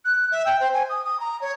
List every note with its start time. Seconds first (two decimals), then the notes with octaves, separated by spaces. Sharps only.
0.05 F#6
0.31 E5
0.45 G5
0.60 C5
0.73 G#5
0.89 D#6
1.04 D#6
1.20 A#5
1.41 C#5